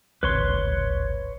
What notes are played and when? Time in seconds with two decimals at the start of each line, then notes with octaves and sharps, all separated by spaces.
0.23 D1 G#1 C#2 B4 C#5 C6